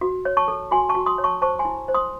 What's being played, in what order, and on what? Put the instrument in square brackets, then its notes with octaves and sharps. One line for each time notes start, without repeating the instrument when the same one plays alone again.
[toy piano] F#4
C#5
A5 C#6
A4
F#4 G#5 C6
A5 C#6
F#4
C6 D#6
C#5
A5 C#6
C5 A5 C#6
G#5 C6
E4
C5
C6 D#6